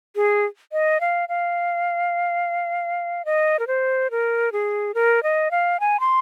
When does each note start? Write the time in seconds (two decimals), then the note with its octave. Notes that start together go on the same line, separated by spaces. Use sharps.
0.16 G#4
0.72 D#5
1.01 F5
1.29 F5
3.25 D#5
3.59 A#4
3.67 C5
4.11 A#4
4.52 G#4
4.95 A#4
5.23 D#5
5.51 F5
5.80 G#5
6.00 C6